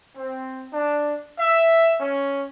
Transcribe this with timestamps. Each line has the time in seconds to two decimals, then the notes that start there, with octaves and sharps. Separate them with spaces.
0.16 C4
0.72 D4
1.38 E5
2.00 C#4